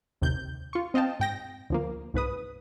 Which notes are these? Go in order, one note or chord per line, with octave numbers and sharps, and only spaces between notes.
A1 D#2 C3 G6
F4 C#6
C4 D#5 F5 G5 A5
G#2 G5 A#6
D2 F3 A#3
C2 G#2 B4 D#6